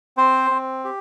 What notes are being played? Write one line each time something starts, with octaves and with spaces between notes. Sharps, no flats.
C4 C5
C4
G4